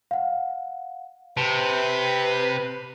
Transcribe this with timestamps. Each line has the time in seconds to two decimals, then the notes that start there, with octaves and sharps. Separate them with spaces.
0.11 F5 F#5
1.37 C3 B4 A5